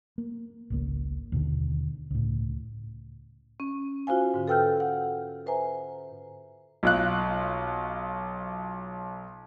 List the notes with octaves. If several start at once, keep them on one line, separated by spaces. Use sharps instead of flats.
A#3
G#1 C#2 A#3
D#2 B2 D3
C#2 A2
C#4
F4 F#4 C5 F5 G#5
G#2 D3
A4 B4 G5 E6 F6 G6
F#5
B4 C5 E5 G#5 A#5
B1 F4 F#6